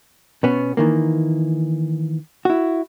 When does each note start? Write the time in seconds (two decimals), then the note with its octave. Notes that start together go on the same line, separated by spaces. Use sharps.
0.43 B2 B3 C#4
0.77 D#3 E3 A#3
2.45 E4 F#4